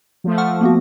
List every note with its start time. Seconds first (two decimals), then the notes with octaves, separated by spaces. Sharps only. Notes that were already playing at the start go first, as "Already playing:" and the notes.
0.24 F3 A3
0.38 F#5 C#6 F6
0.61 A#3 B3 F#4